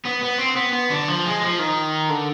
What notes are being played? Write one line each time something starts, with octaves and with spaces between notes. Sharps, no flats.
B3
B3
C4
B3
B3
D3
F3
G#3
F3
D#3
D3